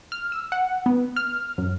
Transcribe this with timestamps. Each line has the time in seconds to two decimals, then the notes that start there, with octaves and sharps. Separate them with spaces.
0.12 F6
0.32 E6
0.52 F#5
0.86 B3
1.16 F6
1.58 F#2